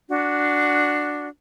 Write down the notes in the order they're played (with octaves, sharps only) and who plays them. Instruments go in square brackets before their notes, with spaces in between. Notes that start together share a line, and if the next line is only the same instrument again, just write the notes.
[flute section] D4 F#4